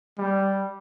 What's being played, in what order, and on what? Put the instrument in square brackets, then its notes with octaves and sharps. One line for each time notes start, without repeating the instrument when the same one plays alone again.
[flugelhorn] G3